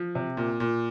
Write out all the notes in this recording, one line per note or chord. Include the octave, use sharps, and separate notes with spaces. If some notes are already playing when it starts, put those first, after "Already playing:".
Already playing: F3
C3
A#2
A#2